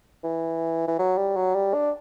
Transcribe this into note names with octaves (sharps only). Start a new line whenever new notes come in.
E3
E3
F#3
G3
F#3
G3
D4